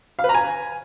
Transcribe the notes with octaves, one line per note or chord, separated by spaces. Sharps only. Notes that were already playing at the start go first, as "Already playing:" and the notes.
F5
B4
A#5
G#5